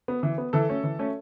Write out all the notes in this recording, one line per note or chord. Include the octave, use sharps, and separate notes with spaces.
B3
E3
B3
E3 A4
A3 C#4
E3
A3 C#4